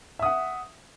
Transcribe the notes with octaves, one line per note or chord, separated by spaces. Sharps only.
E5 F#5 D#6